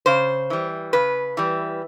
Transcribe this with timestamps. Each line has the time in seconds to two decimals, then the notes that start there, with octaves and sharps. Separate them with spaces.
0.06 C#3 C5
0.50 E3 G3
0.93 C#3 B4
1.37 E3 G3